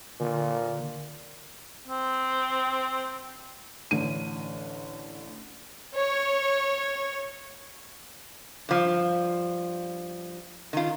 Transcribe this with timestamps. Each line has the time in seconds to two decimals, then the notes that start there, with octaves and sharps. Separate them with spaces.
0.20 A#2 D3
1.88 C4
3.91 A1 D3 D#7
5.95 C#5
8.69 G2 F3
10.73 D#3 F4